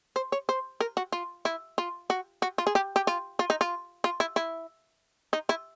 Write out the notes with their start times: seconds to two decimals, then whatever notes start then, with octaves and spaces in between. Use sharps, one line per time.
0.16 C5
0.32 C#5
0.49 C5
0.80 A#4
0.97 F#4
1.12 F4
1.45 E4
1.78 F4
2.10 F#4
2.42 F#4
2.58 F4
2.67 G#4
2.75 G4
2.96 G4
3.07 F4
3.39 F4
3.50 D#4
3.61 F4
4.04 F4
4.20 E4
4.36 E4
5.33 D#4
5.49 E4